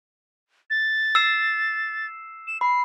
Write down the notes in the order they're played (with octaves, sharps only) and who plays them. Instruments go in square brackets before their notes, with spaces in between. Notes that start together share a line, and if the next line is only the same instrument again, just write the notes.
[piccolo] A6
[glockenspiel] E6 C7 E7
[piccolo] E7
[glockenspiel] B5 [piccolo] C7